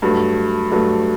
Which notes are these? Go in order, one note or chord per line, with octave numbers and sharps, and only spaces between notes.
G2 F#3 A3
G2 F#3 A3